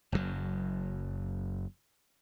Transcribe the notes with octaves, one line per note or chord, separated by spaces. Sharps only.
F#1 F#2 A2 F#3